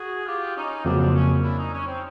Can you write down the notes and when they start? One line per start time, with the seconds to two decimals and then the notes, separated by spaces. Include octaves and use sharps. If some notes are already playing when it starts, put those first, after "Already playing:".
Already playing: F#4 G#4
0.26 F4 G4
0.55 C#4 D#4
0.84 F2 C#3 F#3 A#3 C4 D4
0.99 C4 D4
1.13 C#4
1.43 D4 E4
1.58 C#4 D#4
1.72 C#4
1.86 C4